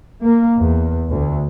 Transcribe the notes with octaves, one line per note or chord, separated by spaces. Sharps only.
A#3
E2
D2